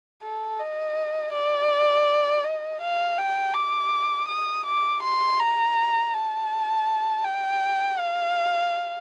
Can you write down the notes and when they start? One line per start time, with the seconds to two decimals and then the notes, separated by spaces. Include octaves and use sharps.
0.23 A4
0.59 D#5
1.33 D5
2.44 D#5
2.82 F5
3.19 G5
3.54 D6
4.28 D#6
4.66 D6
5.03 C6
5.39 A#5
6.14 A5
7.24 G5
7.99 F5